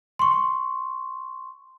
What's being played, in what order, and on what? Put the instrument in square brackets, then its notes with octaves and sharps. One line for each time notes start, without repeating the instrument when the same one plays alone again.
[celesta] C6 C#6